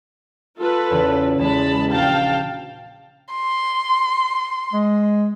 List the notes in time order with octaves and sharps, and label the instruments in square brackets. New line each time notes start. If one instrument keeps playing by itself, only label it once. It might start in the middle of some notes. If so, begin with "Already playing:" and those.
[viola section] F4 A4 B4
[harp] E2 C#3
[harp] E2 [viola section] G#3 A5 B5
[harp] A#1 F#4 G6 [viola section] F5 G5 A5
[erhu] C6
[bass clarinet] G#3